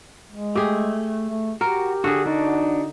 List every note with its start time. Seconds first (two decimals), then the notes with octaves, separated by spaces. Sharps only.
0.31 G#3
0.55 A3 G4 G#4
1.27 A3
1.61 F#4 G4 A#4
2.04 D3 F#4 G#4
2.26 D4 D#4 F#4